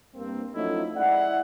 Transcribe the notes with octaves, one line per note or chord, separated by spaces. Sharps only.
G2 A#3 C4
F3 F#3 A3 C#4 D#4 E4
G#3 E4 D5 F#5